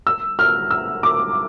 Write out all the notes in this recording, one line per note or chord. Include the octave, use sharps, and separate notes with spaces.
E6
F6
E6
D6